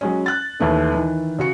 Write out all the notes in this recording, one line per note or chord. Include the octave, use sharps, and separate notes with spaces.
F#3 G#3 C#4
F#6 A6
D#2 E3 A3 B3
D#3 E3
C#3 F#4 C#7